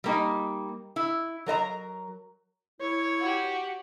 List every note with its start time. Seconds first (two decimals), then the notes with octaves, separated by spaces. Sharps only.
0.04 G3 A#3 D#4
0.96 E4
1.46 F#3 A#4 D#5 A#5
2.81 E4 C#5
3.21 F#4 G4